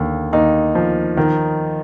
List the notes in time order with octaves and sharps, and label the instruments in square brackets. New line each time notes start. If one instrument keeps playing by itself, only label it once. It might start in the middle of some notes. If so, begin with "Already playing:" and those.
Already playing: [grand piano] D#2 D3
D#2 D#4
F3
D#3